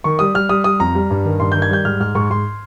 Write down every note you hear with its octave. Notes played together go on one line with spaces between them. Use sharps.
D#3 C#6
G3 D#6
G3 F6
G3 D#6
G3 D#6
F2 A#5
G3
G2
D#3
G2 C6
D#3 G6
G#6
G3 G6
G#2 F6
G#2 F6
G#2 C#6
G#2 C6